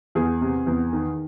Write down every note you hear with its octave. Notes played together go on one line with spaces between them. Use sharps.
E2 G#4
C3
E2
D#3